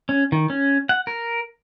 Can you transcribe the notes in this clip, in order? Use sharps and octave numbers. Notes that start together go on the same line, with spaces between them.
C#4
D#3
C#4
F#5
A#4